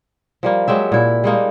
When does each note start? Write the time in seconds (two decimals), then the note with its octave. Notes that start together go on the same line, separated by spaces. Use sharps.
0.43 F3 G3 A#3
0.68 F#3 G#3 G4 E5
0.92 A#2 E4
1.24 G3 G#3 A#3 D#4